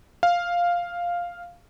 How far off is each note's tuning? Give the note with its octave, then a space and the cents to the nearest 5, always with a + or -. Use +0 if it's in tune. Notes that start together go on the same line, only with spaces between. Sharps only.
F5 +0